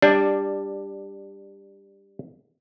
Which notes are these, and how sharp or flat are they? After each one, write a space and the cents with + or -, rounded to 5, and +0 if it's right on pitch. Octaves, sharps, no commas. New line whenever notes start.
G3 +15 D4 +0